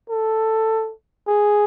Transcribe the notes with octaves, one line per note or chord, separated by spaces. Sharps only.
A4
G#4